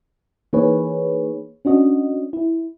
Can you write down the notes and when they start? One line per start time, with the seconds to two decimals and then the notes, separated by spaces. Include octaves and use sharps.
0.53 E3 A#3 D#4 G#4 B4 C#5
1.65 C#4 D4 F#4 D#5
2.33 E4